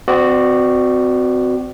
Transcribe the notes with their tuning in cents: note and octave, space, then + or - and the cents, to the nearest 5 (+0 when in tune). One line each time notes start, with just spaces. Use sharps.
C4 -30 F#4 +0 D5 +20